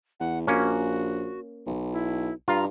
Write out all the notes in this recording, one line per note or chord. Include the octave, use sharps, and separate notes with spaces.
E2 F#5
A#1 A#3 C#4 F#4
B1
E4
G2 F4 A#5